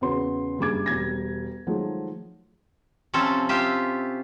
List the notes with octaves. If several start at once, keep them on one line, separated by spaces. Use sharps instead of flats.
E2 C#3 F#4 B4 C6
F#1 G2 G3 G#4 D6 G#6
E1 G3 G#6 A#6
D#3 F3 F#3 G#3 A3
C3 F3 C4 C#4 A4
F4 G4 E5